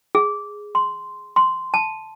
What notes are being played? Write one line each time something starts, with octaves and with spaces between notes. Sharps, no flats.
G#4
C6
C6
A5